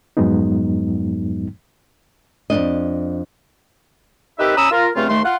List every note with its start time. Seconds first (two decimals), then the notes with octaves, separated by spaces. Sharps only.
0.17 F2 G#2 F#3 G#3 B3 D#4
2.50 F2 C3 D4 D#5
4.39 C4 D#4 G4 A#4 B4 E5
4.57 C#4 A#5 B5 D#6 E6
4.71 F4 A#4
4.95 G2 C#3 A3 C4 F4
5.09 D#2 A3 C6
5.25 F4 F#5